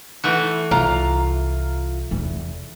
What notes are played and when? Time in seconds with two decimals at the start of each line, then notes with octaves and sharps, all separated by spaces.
0.24 E3 A3 F#4
0.71 C2 F4 A#5
2.11 E2 C3